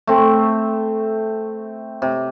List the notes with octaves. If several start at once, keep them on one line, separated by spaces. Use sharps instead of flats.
A3 C4
C3